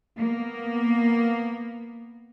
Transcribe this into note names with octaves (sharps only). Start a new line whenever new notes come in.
A#3 B3